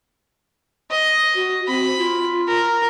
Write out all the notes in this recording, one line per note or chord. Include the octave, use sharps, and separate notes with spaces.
D#5
F#4
C4 B5
F4
A#4